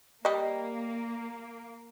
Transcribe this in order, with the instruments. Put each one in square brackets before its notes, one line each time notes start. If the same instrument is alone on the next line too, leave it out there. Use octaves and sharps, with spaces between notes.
[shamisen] G3 D#5 [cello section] A#3